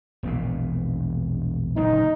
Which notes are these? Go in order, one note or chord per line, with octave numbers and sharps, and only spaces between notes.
E1 A#1 A#2
F#1 A#2 D3 D#4